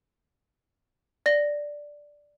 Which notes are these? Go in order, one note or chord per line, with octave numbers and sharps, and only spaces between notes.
D5 A#6